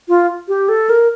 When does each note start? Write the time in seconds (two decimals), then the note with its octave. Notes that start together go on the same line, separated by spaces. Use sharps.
0.08 F4
0.48 G4
0.69 A4
0.89 A#4